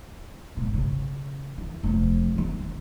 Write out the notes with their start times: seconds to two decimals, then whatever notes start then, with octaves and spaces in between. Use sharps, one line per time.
0.57 G#1 B2
0.74 C#3
1.58 E3
1.83 F1 F3
2.34 E3 C4
2.59 D#3